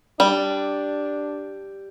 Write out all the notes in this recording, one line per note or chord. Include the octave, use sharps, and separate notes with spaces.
G3 D4